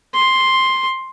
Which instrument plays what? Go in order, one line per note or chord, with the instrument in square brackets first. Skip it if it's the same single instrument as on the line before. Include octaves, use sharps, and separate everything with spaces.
[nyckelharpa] C6